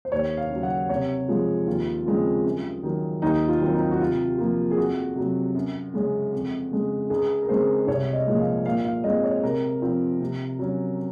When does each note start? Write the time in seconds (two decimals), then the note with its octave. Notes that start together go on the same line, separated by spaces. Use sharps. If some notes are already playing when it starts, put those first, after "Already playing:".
0.05 C5
0.12 D#2 C#5
0.37 F5
0.50 C#3 F#3
0.63 F#5
0.89 C3 C#5
1.28 F3 G#3
1.67 D#2 F4
2.05 C#3 F3 G#3 C4
2.45 F#2
2.83 D#3 F#3
3.22 D#2 D#4
3.48 F4
3.61 D#3 F#3 C4
3.74 D#4
3.92 F#4
4.00 C3 F4
4.38 F3 A#3
4.71 G#4
4.77 F2 F#4
5.16 C3 F#3
5.55 F#2
5.94 C#3 G#3 C#4
6.33 F2
6.71 C#3 G#3
7.10 C#2 G#4
7.42 A#4
7.49 C#3 G#3 C4 C5
7.87 C2 C#5
8.13 D#5
8.27 A#2 F3 G#3
8.39 F5
8.65 A#2 F5
8.84 F5
9.04 G#3 C4 D#5
9.24 C#5
9.43 C3 A#4
9.82 F3 C4
10.21 C3
10.59 F#3 C#4